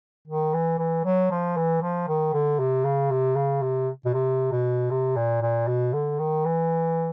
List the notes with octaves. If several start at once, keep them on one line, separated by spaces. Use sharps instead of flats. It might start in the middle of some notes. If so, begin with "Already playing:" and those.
D#3
E3
E3
F#3
F3
E3
F3
D#3
D3
C3
C#3
C3
C#3
C3
B2
C3
B2
C3
A#2
A#2
B2
D3
D#3
E3